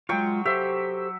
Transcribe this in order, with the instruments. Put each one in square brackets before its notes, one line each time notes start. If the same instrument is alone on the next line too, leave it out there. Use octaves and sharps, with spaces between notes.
[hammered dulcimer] F#3 G5 C#6 [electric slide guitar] G#3 F4
[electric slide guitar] G4 A4 C5 [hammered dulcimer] E5